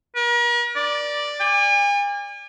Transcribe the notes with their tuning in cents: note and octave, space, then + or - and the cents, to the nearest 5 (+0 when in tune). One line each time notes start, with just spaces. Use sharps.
A#4 +45
D5 +0
G#5 -40